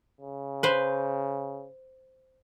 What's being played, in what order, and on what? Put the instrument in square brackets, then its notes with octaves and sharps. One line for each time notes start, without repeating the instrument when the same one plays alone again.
[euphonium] C#3
[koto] B4 C5